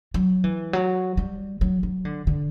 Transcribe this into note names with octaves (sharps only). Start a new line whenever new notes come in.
F#3
E3
F#3
G3
F#3
F#3
D3
D3